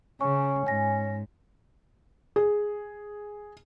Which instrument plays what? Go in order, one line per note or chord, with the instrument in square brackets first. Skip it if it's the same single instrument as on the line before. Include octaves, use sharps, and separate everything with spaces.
[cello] C#3 [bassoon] C#4 [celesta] C#6
[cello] G#2 [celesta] G#5 A#6
[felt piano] G#4